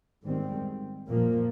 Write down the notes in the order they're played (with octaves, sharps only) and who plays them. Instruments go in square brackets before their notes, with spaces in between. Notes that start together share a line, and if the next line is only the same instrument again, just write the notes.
[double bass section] G#2 D#3 G3 C4
A#2 F3 A#3